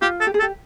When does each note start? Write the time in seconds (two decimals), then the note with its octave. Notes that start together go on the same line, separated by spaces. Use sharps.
0.02 F4 G4
0.20 A4
0.27 G4
0.34 G#4
0.39 A4
0.42 G4